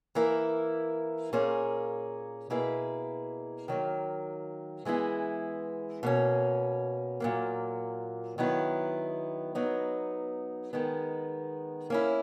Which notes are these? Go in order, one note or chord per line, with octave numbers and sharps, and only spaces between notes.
E3 A#3 E4 A#4
A#2 A#3 C#4 G#4
B2 A#3 E4 G#4 B4
D#3 F#3 A#3
E3 G#3 B3 E4 G#4
B2 A#3 C#4
A#2 F#3 A#3
D#3 F#3 B3 E4
F#3 B3 D#4
D#3 G#3 B3
A#3 C#4 E4